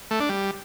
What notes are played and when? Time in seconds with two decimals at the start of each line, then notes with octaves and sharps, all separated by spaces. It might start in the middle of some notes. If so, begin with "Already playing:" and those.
0.11 A3
0.20 D4
0.29 G3